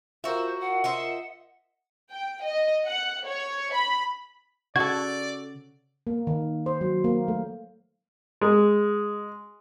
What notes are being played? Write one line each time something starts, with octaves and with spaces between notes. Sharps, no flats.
F4 F#4 A#4 C5 E5
F#5
C5 D#5 E5
G5
D#5
F#5
C#5
B5
C#3 F#4 A4 D5 G#6
A#3
D#3
C5
F#3
A#3
A3
G#3